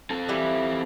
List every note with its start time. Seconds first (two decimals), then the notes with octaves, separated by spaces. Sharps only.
0.10 C4 A4
0.29 E3 G3 E4